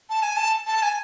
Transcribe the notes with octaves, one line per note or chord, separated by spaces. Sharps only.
A5
G#5
A5
A5
G#5